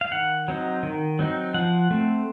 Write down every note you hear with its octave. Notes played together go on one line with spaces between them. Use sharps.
F5
D#3 F#5
F#3 C4 D#4
D#3
F#3 C4 D#4
F3 F#5
A3 C4